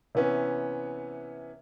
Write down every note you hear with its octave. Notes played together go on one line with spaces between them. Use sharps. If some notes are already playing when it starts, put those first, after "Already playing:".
C3 E3 B3 C#4